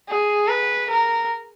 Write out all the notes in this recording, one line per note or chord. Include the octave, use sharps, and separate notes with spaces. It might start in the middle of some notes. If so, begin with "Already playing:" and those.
G#4
B4
A#4